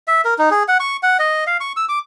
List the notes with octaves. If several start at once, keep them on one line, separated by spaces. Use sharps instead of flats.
E5
A#4
D#4
G#4
F#5
C#6
F#5
D#5
F5
C#6
E6
D6